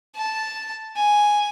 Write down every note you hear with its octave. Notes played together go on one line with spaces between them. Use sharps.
A5
G#5